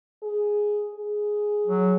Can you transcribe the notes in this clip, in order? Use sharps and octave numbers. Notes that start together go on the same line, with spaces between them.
G#4
G#4
F#3